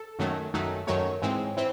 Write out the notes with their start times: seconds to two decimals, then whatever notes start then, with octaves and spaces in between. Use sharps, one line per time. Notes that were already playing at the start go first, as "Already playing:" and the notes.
Already playing: A4
0.19 F#2 D#3 F#3 A3
0.54 F#2 D#3 F#3 A3
0.87 F#2 D#3 F#3 A3 C#5
1.22 G#2 E3 G#3 C4
1.57 E3 C4